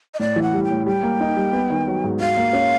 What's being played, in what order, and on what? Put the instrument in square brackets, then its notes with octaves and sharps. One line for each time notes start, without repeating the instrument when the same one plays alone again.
[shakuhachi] D#5
[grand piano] A2 [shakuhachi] D5
[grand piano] E3
[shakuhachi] F#5
[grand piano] G3
[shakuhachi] G5
[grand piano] A2
[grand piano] G3 [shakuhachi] G5
[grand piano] A#3
D#4
G3
B3
D#3
F#3
G#2
[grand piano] F#4 [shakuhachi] F5
[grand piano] A#3
C#4